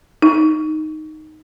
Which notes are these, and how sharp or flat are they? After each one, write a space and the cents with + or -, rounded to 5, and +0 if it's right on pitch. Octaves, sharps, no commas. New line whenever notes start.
D#4 +0